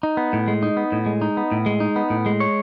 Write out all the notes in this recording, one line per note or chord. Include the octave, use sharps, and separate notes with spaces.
D#4
B3
A2
G#3
D#4
B3
A2
G#3
D#4
B3
A2
G#3
D#4
B3
A2
G#3
C#5